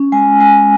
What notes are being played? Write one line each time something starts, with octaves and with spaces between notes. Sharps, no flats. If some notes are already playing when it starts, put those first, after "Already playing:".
Already playing: C#4
G#3 G#5
G#3 G#5